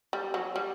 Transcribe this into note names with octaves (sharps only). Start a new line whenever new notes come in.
G3
F#3
G3